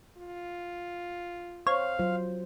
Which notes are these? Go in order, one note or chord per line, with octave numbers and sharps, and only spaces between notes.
F4
C5 C#5 F5
F#3 F4 C5